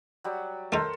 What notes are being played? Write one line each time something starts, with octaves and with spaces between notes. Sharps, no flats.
F#3 G3
A3 D#4 A4 A#4 C5